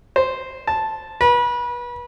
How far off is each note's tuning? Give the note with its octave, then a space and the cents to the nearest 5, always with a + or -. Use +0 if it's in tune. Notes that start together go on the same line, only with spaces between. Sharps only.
C5 -5
A5 -5
B4 -30